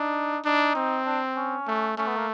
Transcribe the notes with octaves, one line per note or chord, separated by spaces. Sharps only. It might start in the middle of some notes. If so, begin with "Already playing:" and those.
Already playing: D4 D#4
D4 D#4
C4
D4
C#4
A3
A3 C#4
B3
A#3